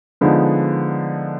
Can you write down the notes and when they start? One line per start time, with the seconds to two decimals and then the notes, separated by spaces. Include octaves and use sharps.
0.21 D3 F3 G#3 B3 D#4